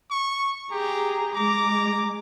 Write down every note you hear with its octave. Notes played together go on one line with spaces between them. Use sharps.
C#6
G4 G#4 A#5
G#3 A#5 D6